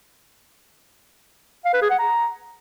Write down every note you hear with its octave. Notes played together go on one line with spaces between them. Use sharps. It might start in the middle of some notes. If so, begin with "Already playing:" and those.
F5
B4
G#4
F#5
A#5